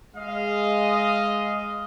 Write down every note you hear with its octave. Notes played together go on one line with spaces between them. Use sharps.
G#3 D#5 F5